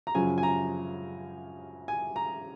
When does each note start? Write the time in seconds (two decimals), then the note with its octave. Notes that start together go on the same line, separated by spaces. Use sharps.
0.07 A#5
0.15 F#2 C#3 F3 G#5
0.38 G#5
0.43 A#5
1.88 G#5
2.16 A#5